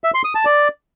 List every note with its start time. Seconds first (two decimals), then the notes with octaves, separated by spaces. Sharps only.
0.04 E5
0.14 C6
0.24 D#6
0.35 A5
0.45 D5